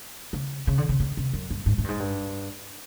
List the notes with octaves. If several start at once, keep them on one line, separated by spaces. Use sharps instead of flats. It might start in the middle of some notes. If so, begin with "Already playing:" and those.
C#3
C#3
D3
C#3
C#3
C3
F#2
G2
G#2
A2
G2
G#2
G2